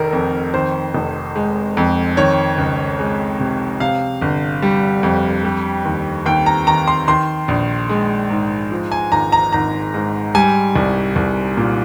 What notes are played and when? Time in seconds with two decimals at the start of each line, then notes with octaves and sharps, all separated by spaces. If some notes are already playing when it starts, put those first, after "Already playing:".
Already playing: F1 D#3 A#4
0.13 F2
0.54 D#3 C5
0.95 F1
1.36 G#3
1.77 F2
2.17 D#3 C#5
2.58 C#2
2.99 G#3
3.40 C3
3.80 C3 F5
4.22 G1
4.62 G3
5.03 F2
5.44 G3
5.85 D#2
6.26 D#2 G5
6.46 A#5
6.67 D#3 A#5
6.88 C6
7.08 D#3 C6
7.48 A#1
7.89 G#3
8.30 G#2
8.71 F3
8.92 G#5
9.12 G#1 A#5
9.32 A#5
9.53 G#1 A#5
9.94 G#2
10.35 G3 G#5
10.76 C2
11.16 C2
11.57 A#2